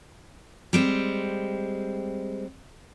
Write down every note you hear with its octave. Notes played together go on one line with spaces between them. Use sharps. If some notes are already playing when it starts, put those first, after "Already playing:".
G3 G#3 C4